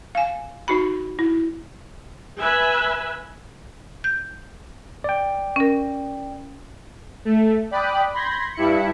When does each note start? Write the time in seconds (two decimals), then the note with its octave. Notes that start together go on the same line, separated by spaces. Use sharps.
0.15 F5 G#5
0.68 D#4 F#4 B5
1.19 E4
2.39 B4 E5 G#5
4.04 G6
5.04 D5 G5
5.56 C#4 A#4
7.25 A3
7.71 D5 G5 B5 D#6 F#6
8.14 B5 C6 G6 G#6 A#6
8.55 G2 E4 B5 C#7